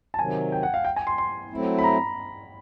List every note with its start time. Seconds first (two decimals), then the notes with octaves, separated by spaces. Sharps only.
0.14 A5
0.19 C3 D#3 F#3 G#5
0.52 G5
0.63 F#5
0.74 F5
0.84 G5
0.96 G#5
1.07 C6
1.18 C6
1.51 F#3 A3 C4 E4
1.79 B5
1.84 A#5